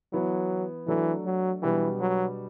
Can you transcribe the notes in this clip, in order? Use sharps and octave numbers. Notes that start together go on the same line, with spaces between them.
E3 F#3 B3 E4
E3 F#3 A3 D4 A4
F#3
B2 E3 G3 B3 D4 G4
F#3